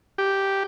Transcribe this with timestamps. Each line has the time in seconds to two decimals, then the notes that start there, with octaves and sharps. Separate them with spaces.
0.18 G4